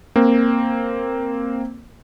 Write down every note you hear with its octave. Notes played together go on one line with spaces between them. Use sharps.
A#3 C4